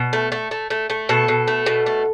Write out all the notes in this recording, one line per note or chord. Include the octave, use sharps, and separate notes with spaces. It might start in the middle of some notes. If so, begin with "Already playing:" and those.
Already playing: B2
A3
A3
A3
A3
A3
B2 A4
B2
A3
B2
A3